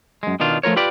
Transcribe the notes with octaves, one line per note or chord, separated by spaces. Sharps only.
F#2 G#3
B2 D#3 D4 F4
F3 A3 F4 A#4 C#5
F4 G4 B4 D5